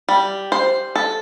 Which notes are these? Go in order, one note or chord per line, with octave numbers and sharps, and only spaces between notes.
G3
C5
A4